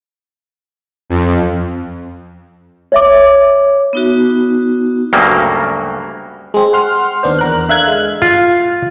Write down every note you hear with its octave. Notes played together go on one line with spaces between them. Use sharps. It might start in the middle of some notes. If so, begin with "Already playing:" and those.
F2
C#5 E5 D6
B3 D#4 F#4
D2 G2 C#3 F#3 G3 A#3
G#3 C4
F#5 C6 F6
D#2 B3 D4 C5
E2 A#4 F#6
D3 E5 F5 F#6 G#6
G#3
F4